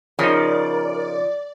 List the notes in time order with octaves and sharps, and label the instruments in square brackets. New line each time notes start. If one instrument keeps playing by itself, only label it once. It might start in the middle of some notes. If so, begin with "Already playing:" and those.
[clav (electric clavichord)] C#3 D#4 [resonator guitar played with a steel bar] F3 [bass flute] A#4 [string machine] D5